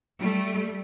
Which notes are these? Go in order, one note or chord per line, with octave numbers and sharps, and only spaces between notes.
G3 A3